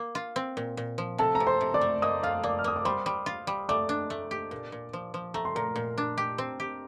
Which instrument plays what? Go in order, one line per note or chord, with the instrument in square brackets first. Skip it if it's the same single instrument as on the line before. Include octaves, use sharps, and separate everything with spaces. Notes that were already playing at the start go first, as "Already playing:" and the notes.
Already playing: [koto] A#3
F4
C4
A#2
A#2
F3
[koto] C3 [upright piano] A4 A5
[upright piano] A#5
[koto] C3
[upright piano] C5 C6
[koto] C3
[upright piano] D5 D6
[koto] A3
[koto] A#3 [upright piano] D#5 D#6
[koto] F4 [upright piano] F5 F6
[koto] A#3 [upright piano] D5 D6
[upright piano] F6
[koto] A#3 [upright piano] D#6
[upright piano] D6
[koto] G3 [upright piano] C5 C6
[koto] G3
F4
G3
[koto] A3 [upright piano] D5 D6
[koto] D4
A3
G4
A#2
A#2
F3
F3
[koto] A3 [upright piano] A#5
[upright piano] C6
[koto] A#2 [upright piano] A#4 A#5
[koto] A#2
D4
G4
C4
G4